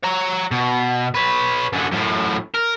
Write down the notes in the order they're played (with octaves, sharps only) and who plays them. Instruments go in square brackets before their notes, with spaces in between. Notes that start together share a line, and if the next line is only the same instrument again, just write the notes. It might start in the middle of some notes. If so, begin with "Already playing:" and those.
[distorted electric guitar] C#5 A#5
B2
B4 C#5
F#2 D3
F#2 A2
A#4